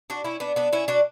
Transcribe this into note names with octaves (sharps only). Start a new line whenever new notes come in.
D4 F#4
C#4 E4
B3 D4
B3 D4
C#4 E4
D4 F#4